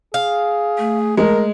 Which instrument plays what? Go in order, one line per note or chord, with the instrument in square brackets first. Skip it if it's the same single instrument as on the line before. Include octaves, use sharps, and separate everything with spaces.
[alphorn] G#4 [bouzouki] F5
[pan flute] A3
[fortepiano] G#3 [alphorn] A#4